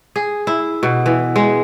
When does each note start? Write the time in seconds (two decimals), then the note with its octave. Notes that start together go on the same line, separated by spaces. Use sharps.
0.16 G#4
0.47 E4
0.83 B2
1.06 E3
1.36 G#3